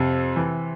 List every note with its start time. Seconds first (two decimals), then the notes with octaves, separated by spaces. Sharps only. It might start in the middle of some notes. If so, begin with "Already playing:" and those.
Already playing: F2 C3
0.36 E3